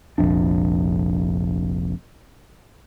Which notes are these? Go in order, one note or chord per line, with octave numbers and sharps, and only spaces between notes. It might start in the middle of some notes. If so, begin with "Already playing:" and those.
F1 A#1 F2 D4